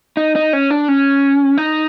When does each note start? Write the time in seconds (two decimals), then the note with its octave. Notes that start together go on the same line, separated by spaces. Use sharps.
0.17 D#4
0.36 D#4
0.53 C#4
0.70 D4
0.88 C#4
1.58 D#4